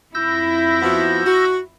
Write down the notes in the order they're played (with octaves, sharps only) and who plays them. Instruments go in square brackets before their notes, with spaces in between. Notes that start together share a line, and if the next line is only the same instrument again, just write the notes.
[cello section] F2 E4 [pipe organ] E6 G6 A#6
[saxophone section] F3 B3 F#4
F#4